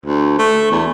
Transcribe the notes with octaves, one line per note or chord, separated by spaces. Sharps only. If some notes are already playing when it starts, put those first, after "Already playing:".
D2
A3
E2